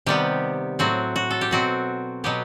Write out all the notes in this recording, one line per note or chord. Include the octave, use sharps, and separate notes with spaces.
C3 D#3 G3 B3 G4
A2 F#3 C4 F#4
F#4
A4
G4
B2 F#3 C4 F#4
B2 F#3 B3 G4